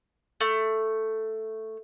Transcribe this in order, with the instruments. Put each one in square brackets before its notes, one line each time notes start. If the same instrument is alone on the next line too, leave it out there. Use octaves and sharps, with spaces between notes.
[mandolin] A3